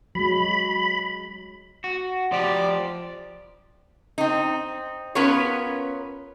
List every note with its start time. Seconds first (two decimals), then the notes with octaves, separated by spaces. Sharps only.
0.15 F#3 G#3 B5
1.84 F#4
2.32 F3 G4 D5
4.18 C4 D#4
5.15 B3 C#4 F4 A#4 B4 C#5